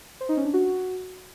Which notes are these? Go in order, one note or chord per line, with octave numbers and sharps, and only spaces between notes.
C5
D#4
C#4
D4
F#4